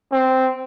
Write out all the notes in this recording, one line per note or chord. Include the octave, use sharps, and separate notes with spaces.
C4